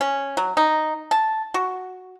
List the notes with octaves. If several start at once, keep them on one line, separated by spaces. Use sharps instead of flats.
C#4
F#3
D#4
A5
F#4